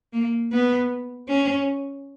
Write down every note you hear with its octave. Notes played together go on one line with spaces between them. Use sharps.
A#3
B3
C#4